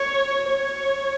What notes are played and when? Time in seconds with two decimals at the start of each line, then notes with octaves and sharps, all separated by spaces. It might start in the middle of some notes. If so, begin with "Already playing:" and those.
Already playing: C#5
0.49 C#5